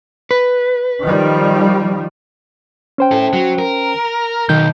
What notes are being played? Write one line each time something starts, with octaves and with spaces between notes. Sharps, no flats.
B4
D#3 F3 G3
C#4 C5 G5
E4 A4
F#3
A#4
B1 D#3 G6